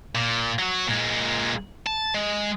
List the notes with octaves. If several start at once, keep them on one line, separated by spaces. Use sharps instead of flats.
A#2
F#3 F#4
A#2 G#3
A5
G#3